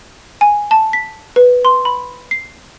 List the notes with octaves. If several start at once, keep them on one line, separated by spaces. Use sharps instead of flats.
G#5
A5
B6
B4
C6
B5
C7